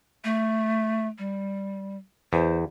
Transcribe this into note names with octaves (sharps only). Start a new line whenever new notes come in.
A3
G3
E2 C5